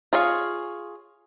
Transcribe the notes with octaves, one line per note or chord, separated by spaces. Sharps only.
F4 G#4 C#5 F5